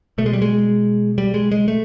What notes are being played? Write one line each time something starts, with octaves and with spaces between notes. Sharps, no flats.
B2 A3
G#3
G3
G#3
G3
G#3
G#3
A3